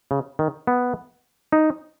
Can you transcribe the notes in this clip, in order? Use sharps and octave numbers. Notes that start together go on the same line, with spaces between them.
C#3
D#3
B3
D#4